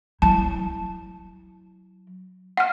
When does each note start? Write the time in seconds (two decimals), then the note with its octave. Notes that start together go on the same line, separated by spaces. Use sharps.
0.22 F#3 E4 A5
2.57 F#5 F6